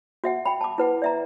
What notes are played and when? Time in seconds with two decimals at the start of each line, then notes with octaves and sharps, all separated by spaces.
0.24 F#4 E5 F#5
0.46 G5 B5
0.61 A5 D6
0.78 E4 B4 F#5
1.02 D5 E5 A#5